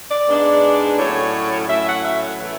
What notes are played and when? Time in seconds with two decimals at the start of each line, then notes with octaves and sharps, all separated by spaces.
0.10 D5
0.27 G#2 G#3 B3 D4
0.97 A2 F#3 C#4 C#5
1.69 A2 F#3 C#4 E5
1.86 F#5
2.05 E5
2.22 C#5
2.41 E3 A3